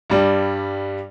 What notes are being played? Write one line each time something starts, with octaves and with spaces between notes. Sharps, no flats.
G2 G3